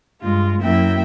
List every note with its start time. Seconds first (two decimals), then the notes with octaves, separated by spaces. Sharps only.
0.21 G2 G#3 F4
0.61 F#2 A#3 E4 E5 G5